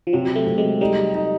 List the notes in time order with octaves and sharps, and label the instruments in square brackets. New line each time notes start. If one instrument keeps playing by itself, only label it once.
[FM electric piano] F3
[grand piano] C3 [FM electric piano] F#3
[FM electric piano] A3
[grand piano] C3
[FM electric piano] G#3
[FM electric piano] G3 [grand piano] D#4
[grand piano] D#4